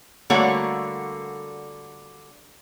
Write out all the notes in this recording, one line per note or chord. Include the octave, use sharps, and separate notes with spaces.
D3 G3 A3 A#3 F#4 C#5